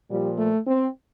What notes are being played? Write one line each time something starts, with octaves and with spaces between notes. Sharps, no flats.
A#2 F3 G3
A3
C4